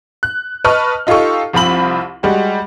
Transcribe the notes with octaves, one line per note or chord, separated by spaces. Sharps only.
F#6
B4 D#5 A5 C#6 F6
D#4 F4 G4 A4 C#6
C2 F3 C4 B5 F#7
G3 G#3 F#4